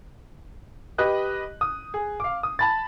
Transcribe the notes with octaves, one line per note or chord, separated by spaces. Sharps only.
G4 B4 D#5 F#6
D#6
G#4
F5 D6
D#6
A5 B5 A6